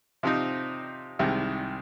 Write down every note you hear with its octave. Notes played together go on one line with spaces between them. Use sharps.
C3 F3 C4 D#4
C2 C3 D#3 G#3